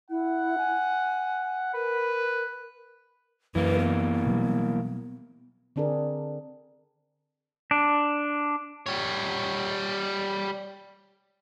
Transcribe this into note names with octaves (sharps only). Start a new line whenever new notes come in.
E4 F#5
G#5
A#4 B4
F#2 E3 A#3 B4
B3
B2 F#3 G3
D3 C4 D4 G#4 A#4
D4
G3 C#5